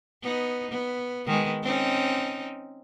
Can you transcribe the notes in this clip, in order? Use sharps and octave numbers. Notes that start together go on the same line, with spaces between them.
B3 D#4
B3
D#3 G#3 B3
C4 C#4 D#4